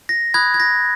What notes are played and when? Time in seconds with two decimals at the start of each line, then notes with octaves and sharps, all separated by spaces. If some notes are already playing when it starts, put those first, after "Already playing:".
0.09 A#6
0.34 B5 D#6 F#6 G#6
0.54 G#6
0.60 A#6